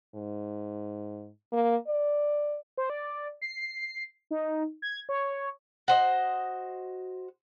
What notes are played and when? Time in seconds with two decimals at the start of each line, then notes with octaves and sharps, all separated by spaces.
0.15 G#2
1.53 A#3
1.87 D5
2.77 C5
2.90 D5
3.42 C7
4.31 D#4
4.82 G#6
5.09 C#5
5.88 F#4 C5 D#5